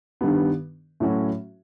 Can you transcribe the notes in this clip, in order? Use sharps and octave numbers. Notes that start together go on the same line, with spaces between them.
G2 D#3 G3 B3
A2 F#3 A3 C#4 F#4